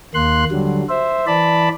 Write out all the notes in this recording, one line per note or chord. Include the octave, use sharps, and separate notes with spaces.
D#2 A#3 C6 F#6
D3 F#3 G3
C5 E5
E3 D5 A5 B5